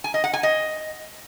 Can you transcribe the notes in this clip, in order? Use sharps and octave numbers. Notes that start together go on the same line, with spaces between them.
G#5
D#5
F#5
G#5
D#5